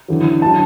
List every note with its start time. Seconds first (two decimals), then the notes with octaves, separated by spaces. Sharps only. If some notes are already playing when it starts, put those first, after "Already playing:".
0.08 E2 D3 F#3
0.42 D3 F#3 A5